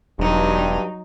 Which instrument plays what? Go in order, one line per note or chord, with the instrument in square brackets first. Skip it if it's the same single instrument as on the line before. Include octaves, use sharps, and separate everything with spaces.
[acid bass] E1 [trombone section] G2 [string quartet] F#3 D#4